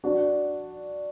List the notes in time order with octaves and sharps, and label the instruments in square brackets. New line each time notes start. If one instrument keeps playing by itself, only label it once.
[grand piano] D4 F#4